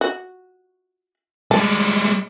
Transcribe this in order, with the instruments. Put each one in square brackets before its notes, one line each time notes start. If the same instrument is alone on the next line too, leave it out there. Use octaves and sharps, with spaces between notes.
[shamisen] F#4
[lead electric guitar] G3 G#3 [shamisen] A5